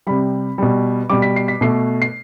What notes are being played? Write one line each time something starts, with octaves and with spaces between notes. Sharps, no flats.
C3 G3 B5
B2 G3
B2 G3 D6
B6
C7
B6
B2 A3 C7
C7